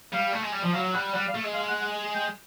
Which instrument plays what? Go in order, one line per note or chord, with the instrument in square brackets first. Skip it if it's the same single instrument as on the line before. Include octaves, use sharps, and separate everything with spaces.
[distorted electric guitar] G3 [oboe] F5
[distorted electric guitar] A3
G#3
G3
F3
[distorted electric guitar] F#3 [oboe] F5
[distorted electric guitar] G3 [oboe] F#5
[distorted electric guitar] G3 [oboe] F#5
[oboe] F5
[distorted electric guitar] A3
G#3
[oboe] F5
F#5
F#5
G5